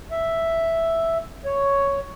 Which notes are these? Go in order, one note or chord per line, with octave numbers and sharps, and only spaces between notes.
E5
C#5